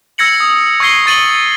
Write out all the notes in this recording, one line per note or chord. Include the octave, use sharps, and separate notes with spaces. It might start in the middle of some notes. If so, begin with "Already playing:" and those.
E6 G#6 A#6 C#7 F#7
D#6
C#6 E6 G#6 C7 G7
C#6 A6 D#7 F#7 G7